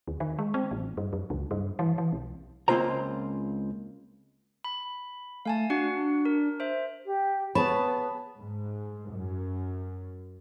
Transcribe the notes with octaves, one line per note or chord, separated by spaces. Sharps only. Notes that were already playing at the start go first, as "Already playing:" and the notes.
D#2
D#3
G#3
C4
A1
G2
F#2
C#2
G2
E3
E3
B1
C#2 A#3 C4 F4 C5 A#5
B5
A3 F5 G#5 A5
D4 F#4 F#5
A#4
C5 E5
G4
B3 G#4 C#5 A5 B5
G#2
F#2